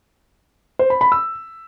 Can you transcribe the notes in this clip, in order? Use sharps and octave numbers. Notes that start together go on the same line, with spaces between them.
C5
B5
B5
E6